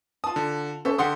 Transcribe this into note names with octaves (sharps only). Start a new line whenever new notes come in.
F4 A5 D#6
D3
C#4 A4 C5 E5
D3 G4 F#5 C6 D#6